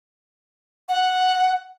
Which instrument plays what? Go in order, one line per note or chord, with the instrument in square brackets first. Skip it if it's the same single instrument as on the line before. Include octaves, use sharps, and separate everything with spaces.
[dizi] F#5